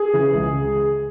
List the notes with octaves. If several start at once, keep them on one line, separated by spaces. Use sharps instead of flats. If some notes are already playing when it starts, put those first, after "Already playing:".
Already playing: G#4
C#3 E3
C#2